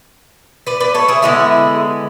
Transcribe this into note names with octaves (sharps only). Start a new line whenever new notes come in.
B4 D5
B4 D5
A4 C#5
E4 G#4
D3 G#3 B3 E4 G#4